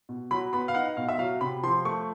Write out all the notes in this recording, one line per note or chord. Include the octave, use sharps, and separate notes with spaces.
B2
F#3 B5
B3 B5
F5
D#4 F#5
B2 F5
E5
F#3 F5
C3 B5
F3 C6
A3 C#6